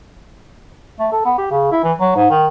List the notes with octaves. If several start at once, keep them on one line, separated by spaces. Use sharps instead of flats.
A3
A4
B3
G4
C#3
E4
E3
F#3
G#2
D#3